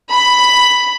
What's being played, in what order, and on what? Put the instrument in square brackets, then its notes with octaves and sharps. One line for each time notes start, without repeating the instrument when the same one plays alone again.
[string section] B5